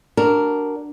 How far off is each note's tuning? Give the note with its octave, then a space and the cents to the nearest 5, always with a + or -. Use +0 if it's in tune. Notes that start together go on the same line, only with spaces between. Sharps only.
D4 +0 F#4 +15 A#4 +0